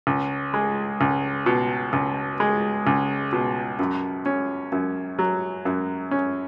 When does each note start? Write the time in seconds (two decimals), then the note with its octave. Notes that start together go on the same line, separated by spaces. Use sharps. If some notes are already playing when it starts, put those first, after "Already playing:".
0.07 C#2
0.54 G#3
1.01 C#2
1.46 B2
1.93 C#2
2.40 G#3
2.87 C#2
3.33 B2
3.79 F#2
4.26 C#4
4.72 F#2
5.19 F#3
5.65 F#2
6.11 C#4